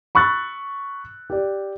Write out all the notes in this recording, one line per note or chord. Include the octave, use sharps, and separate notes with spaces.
B5 C#6 E6 F#6 A6
G4 D5